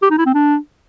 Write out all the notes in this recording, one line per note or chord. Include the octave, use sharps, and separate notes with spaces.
G4
D#4
E4
C4
D4